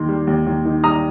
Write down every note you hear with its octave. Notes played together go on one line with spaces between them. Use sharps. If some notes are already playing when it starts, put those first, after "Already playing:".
Already playing: D#2 D#3 C6
G3
D#2
D#2
D#3
G3 A#5 D#6